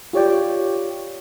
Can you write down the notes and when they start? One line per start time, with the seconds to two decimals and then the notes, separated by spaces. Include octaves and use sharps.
0.13 F4 G4 C#5 D5 G5